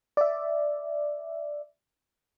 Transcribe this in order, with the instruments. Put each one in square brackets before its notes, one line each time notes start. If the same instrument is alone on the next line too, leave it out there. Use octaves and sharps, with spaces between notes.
[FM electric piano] D5 E5